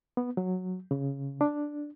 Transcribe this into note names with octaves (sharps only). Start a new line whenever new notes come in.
B3
F#3
C#3
D4